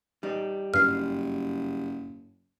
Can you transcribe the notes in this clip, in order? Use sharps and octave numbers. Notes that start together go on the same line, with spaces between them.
G3 D#4
F#1 G2 F6 C7